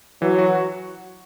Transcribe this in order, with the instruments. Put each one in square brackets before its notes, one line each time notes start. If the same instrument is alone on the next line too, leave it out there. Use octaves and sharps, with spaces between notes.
[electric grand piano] E3 [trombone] F#3
[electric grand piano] F#4